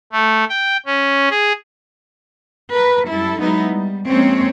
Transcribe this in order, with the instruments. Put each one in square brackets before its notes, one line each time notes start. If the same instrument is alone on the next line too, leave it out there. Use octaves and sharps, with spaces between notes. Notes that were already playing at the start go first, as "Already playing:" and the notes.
[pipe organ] A3
G5
C#4
G#4
[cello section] A#4 B4
F#2 G3 E4 A4
F#3 G#3 B3 D#4 E4
G3
F2 G#3 A#3 C4 C#4 C#5